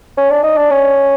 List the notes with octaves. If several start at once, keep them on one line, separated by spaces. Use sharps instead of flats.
C#4
D4
D#4
D4
C#4